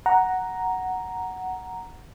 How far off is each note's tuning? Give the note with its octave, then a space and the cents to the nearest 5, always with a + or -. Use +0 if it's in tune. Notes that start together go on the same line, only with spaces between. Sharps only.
F#5 +5 A#5 +0